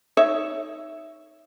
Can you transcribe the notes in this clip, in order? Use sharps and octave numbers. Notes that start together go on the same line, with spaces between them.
D#4 C#5 E5